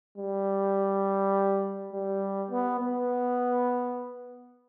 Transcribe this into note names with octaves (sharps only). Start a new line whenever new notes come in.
G3
G3
B3
B3